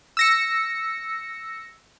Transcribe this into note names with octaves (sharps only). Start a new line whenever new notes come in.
E6 A#6 C#7